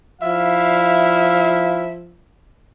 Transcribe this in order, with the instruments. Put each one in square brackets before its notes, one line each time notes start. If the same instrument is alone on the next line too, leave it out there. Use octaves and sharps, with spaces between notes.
[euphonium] F3 [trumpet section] E4 F5 [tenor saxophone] E5